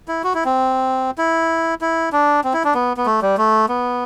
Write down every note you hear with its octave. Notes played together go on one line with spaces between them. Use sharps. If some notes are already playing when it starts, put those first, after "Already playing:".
E4
F#4
E4
C4
E4
E4
D4
C4
E4
D4
B3
B3
A3
G3
A3
B3